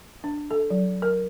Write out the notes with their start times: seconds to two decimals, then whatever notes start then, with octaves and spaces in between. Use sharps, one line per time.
0.24 D4
0.51 A4
0.70 F#3
1.02 A#4